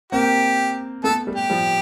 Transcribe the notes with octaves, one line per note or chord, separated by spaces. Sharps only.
A#3 C4 G4
A3 B3 A4
G3 A3
G4
F3 G3